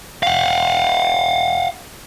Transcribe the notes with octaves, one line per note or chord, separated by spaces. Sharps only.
F5 F#5